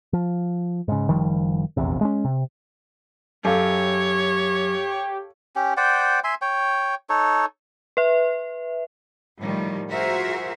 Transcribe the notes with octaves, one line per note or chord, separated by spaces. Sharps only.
F3
G#2 C#3
F#1 D#3 F3 G3
F1 A#1 E2 C3
G#3 A#3 C#4
C3
F#2 G4 A4 C#5 F5
C#4 G4
C5 D5 F#5 G5
E5 G#5 C6
C#5 G5
D#4 A4 C#5
B4 E5
A2 D#3 F3 G3
F4 F#4 G#4 A#4 C5 E5